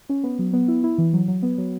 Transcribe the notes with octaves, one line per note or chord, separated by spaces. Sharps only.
C#4
B3
F#3
B3
E4
E4
E3
F#3
F#3
B3
F#3